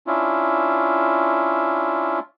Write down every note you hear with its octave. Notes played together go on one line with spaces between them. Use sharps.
C#4 D4 E4 F4